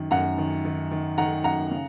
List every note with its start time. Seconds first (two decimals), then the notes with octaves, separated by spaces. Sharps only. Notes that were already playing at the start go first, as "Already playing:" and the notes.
Already playing: F#2 D#3
0.11 F#2 F#5 A#5
0.38 D#3
0.65 D#3
0.91 D#3
1.18 D#3 F#5 A#5
1.44 F#2 F#5 A#5
1.71 C#3